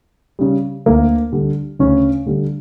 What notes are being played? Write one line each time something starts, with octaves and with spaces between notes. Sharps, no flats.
C#3 G3
D2 A#3
D3 G3
D2 C#3 C#4
D3 G3